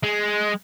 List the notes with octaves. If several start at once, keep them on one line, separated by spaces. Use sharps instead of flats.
G#3